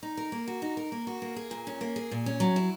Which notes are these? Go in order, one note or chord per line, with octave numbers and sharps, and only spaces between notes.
D#4
A#4
A#3
F#4
D#4
A#4
A#3
F#4
A#3
G#4
A#2
C#4
A#3
G#4
A#2
C#4
F#3
E4